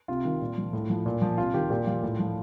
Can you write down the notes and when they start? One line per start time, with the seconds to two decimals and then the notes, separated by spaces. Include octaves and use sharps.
0.08 C3 F4
0.25 D#3
0.41 A#2
0.58 F3
0.73 A2
0.90 F3
1.06 A#2
1.22 F3
1.38 C3 F4
1.54 D#3 G4
1.70 A#2 G4
1.87 F3 F4
2.03 A2
2.19 F3